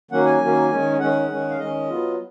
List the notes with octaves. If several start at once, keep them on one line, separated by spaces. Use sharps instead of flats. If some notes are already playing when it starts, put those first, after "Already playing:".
D#3 F#3 A#3 C#4 F#5
G#5
D#3 F#3 A#3 C#4
D#3 G#3 C#4
D#3 G#3 C#4 F#5
D#3 G#3 C#4
F5
D#3 G#3 C#4 D#5
F#3 B3 F4